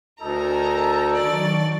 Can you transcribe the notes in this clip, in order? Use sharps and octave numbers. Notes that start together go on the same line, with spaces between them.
D2 D#4 A4 A#4 G#5 A#5
D#3 F#3 D5 C#6 A6